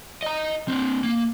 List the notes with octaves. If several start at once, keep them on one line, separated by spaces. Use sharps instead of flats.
D#5 A#5
C4 D4
A#3